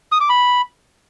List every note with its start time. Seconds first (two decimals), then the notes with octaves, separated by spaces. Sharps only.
0.12 D#6
0.21 D6
0.29 B5